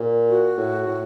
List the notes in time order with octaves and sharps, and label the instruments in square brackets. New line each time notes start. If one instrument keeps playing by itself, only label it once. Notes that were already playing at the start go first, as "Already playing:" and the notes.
Already playing: [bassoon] A#2
[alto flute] F#4
[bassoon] A2
A2